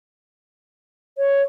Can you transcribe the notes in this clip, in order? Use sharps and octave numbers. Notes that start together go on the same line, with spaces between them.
C#5